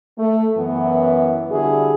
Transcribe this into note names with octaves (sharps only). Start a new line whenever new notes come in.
A3
F#2 E3 B3
D3 G3 E4 F#4 G#4